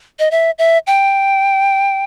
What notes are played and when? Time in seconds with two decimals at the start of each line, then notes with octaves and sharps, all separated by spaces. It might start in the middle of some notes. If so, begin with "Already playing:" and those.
0.19 D#5
0.31 E5
0.58 E5
0.87 G5